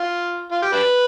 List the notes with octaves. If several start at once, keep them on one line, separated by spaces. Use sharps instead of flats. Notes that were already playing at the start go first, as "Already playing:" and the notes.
Already playing: F4
F4
G4
D4 G4 B4